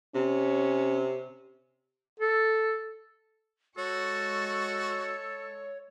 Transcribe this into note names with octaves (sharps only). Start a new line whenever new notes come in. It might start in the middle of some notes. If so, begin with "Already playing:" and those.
C3 C#4
A4
G#3 F#4 A4 C#5 C#6